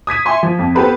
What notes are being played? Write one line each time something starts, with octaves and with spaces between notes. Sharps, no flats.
D#6 G#6 B6 D#7
E5 G#5 C6 C#6
F3
F2
B3 G4 A4 B4 C5